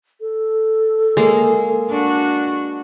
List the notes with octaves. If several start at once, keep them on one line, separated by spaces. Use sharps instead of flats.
A4
G#3 A#3
D4 F#4